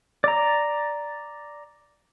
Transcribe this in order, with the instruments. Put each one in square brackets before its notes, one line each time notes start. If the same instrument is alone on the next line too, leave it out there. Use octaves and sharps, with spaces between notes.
[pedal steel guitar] D5 A#5